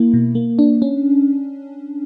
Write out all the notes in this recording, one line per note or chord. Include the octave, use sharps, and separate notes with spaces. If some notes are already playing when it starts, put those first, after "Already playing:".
Already playing: A#3 E4
B2
A#3
D4
C#4